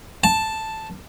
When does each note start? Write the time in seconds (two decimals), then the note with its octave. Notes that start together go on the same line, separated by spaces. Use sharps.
0.24 A5